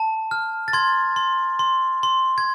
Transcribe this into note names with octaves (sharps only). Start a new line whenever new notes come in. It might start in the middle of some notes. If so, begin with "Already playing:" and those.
Already playing: A5
F6
A6
C6 G#6
C6
C6
C6
G#6